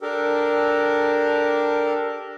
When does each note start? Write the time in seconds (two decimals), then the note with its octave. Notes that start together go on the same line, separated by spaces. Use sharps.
0.01 D4 G4 A4 A#4